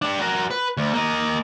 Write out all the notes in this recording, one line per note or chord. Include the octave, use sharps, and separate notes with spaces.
G3 D4
F#4 A#4
B4
D2
A#3 D#5